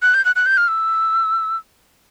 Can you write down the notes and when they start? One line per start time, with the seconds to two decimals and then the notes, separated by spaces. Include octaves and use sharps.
0.02 F#6
0.14 G6
0.25 F#6
0.36 F#6
0.46 G6
0.57 F6
0.68 E6